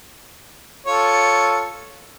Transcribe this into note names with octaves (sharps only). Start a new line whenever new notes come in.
F4 A4 C#5